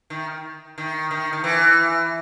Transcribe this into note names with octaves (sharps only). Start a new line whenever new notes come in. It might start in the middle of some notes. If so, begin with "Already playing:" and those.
D#3
D#3
D#3
D#3
E3